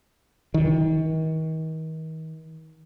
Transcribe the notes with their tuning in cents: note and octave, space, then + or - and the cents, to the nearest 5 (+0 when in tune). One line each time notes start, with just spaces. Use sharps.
D#3 +40